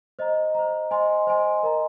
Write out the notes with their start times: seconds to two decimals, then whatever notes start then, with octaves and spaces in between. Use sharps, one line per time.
0.19 C5 D#5 A#5
0.55 C5 D#5 A#5
0.91 C5 D#5 G#5 C6
1.27 C5 D#5 G#5 C6
1.63 A#4 D#5 A#5